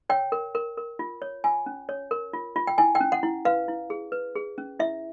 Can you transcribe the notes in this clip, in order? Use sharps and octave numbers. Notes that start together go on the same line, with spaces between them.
C#5 G5
A#4
A#4
A#4
F4
C#5
F4 G#5
C#4
C#5
A#4
F4
F4
G5
E4 G#5
G5
C#4
F#5
E4
B4 F5
E4
G#4
B4
G#4
C#4
E4 E5